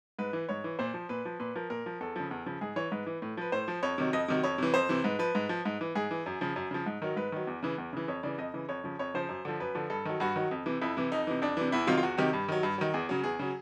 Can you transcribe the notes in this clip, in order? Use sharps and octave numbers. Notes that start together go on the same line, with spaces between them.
G#2 B4
E3
G#2 C#5
E3
A#2 C5
F3
A#2 B4
F3
A#2 B4
F3 A#4
A#2 A#4
F3
E2 A4
C#3 F3
E2
C#3 F3
G#2 G#4
E3 C#5
G#2 B4
E3
A2
F3 B4
A2 C5
F3
F2 C#5
C3 D#3 F#3
F2 D#5
C3 D#3 F#3
F2 C#5
C3 E3
F2 C5
C3 E3
G#2 B4
F3 B4
G#2
F3
G#2
E3
G#2 G#4
E3
F#2
C#3 F3
F#2
C#3 F3
G#2
D#3 F#3 A#4
G#2 B4
D#3 F#3
E2
C#3 E3
E2
C#3 E3
F2 C#5
C#3 E3 D5
F2 D#5
C#3 E3
F2 C#5
C#3 F3
F2 C#5
C#3 F3 C5
F#2
D3 F3
F#2 B4
D3 F3
G2 A4
D#3 F#3
G2 F#4
D#3 F#3
F2
C3 E3
F2 E4
C3 E3
F2 D#4
C3 E3
F2 D4
C3 E3
E2 E4
C3 D#3 F#3 F4
F4
E2 F#4
C3 D#3 F#3 G4
G2
D#3 F#3
G2
D#3 F#3
E2 G#4
C#3 F#3
E2 G#4
C#3 F#3